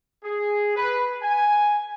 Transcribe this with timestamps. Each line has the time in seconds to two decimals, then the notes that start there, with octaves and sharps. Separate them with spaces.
0.24 G#4
0.77 B4
1.22 G#5